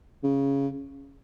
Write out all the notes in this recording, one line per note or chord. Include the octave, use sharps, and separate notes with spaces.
C#3